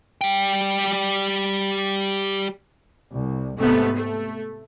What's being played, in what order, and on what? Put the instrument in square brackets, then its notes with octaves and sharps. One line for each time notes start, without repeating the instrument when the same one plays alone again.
[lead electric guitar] G3 G5
[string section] C2
G#2 C3 A3 B3
A3